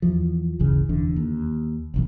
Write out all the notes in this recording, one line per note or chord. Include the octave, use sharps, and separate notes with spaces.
E2 F3
G1 D2 C#3 E3
F1 E2 D3
D#2
F1 B1 E2